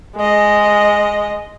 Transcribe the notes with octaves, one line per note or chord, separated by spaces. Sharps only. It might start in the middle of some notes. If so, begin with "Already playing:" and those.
G#3 D#5